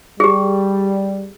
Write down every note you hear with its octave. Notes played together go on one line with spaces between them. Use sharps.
G3 G4 G#4